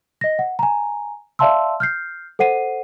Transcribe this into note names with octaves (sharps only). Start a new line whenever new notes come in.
D#5 A#6
F#5
G#5 A#5
D5 E5 F5 A5 C6 E6
F6 G6 C7
A4 C5 F#5 C7 D#7